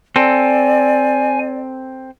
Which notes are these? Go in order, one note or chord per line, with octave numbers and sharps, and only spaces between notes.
C4 A4 D5 G#5